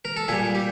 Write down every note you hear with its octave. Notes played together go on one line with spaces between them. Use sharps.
A#4
A4
A#2 G3 G#4
G4